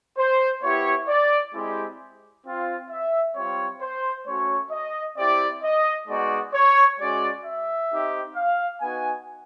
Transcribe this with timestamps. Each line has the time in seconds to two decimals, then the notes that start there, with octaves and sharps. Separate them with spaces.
0.18 C5
0.62 B3 E4 G4 C#5
1.08 D5
1.53 G#3 C4 E4 G4
2.45 C4 F4
2.90 E5
3.35 G3 C4 F4 C#5
3.81 C5
4.26 A3 C#4 F#4 C#5
4.71 D#5
5.17 C4 E4 G4 D5
5.63 D#5
6.08 G#3 B3 D#4 F#4 D5
6.53 C#5
6.98 G#3 C#4 F#4 D5
7.45 E5
7.91 C4 D#4 G4
8.35 F5
8.81 B3 D#4 F#4 G#5